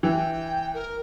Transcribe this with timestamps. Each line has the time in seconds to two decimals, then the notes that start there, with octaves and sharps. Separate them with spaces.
0.03 E3 G5
0.74 A#4